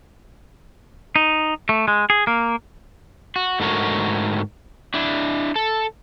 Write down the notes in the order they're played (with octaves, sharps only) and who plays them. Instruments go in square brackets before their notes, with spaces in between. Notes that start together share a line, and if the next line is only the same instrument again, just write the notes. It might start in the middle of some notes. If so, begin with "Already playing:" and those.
[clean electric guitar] D#4
A3
G#3
G#4
A#3
[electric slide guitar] F#4
G#2 D3 A3 F#4 A#4 C#5
D4 E4
A4